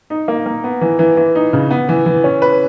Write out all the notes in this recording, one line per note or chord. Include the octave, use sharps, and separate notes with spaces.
D#4
A#3
A#3
B3
E3
E3
E3
D#4
C#3
B3
E3
E3
C#4
B4